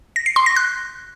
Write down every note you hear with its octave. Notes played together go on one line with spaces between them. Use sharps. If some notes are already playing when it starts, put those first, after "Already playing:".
A#6
C7
C6
A#6
F#6